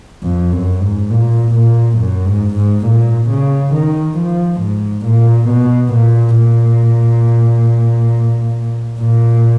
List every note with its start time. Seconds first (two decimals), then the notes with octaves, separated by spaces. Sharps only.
0.23 F2
0.52 F#2
0.81 G#2
1.11 A#2
1.55 A#2
1.98 F#2
2.27 G#2
2.56 G#2
2.86 A#2
3.30 C#3
3.73 D#3
4.18 F3
4.61 G#2
5.05 A#2
5.49 B2
5.93 A#2
6.37 A#2
9.00 A#2